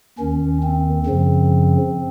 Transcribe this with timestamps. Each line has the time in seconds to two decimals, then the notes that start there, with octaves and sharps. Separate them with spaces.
0.19 D#2 D#3 C#4
0.63 C4
1.06 F#2 C#3 F3